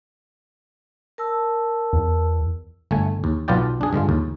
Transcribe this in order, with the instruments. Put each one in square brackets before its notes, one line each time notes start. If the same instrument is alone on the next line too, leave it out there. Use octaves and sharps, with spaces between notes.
[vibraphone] A#4 A5 E6
[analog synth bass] E2
[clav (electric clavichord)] G1 A3 G#5
D#2
B1 B3 F4 D5 G5
D4 G#4
G2 D3 G#3 F4
D#2